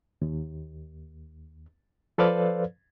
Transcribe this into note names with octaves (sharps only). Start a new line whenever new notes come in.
D#2
F3 A4 B4 C5 D5 F5